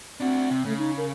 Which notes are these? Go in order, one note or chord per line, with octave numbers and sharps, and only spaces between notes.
C4 D4 F#4
C3
C#3 A3
D#4
A#4